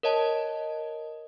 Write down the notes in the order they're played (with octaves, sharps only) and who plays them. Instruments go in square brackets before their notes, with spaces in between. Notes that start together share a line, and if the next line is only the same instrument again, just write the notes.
[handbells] A#4 C#5 D#5 A5